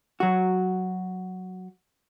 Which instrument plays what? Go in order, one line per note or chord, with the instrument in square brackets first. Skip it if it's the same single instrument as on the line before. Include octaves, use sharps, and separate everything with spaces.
[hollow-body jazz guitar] F#3 F#4